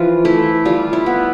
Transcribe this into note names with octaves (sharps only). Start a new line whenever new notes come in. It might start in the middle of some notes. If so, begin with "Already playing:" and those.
Already playing: E3 F3 F4
A3 E4
G3 F4
E4
B3